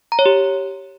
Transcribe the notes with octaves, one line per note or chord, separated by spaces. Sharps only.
A#5
C#5
G4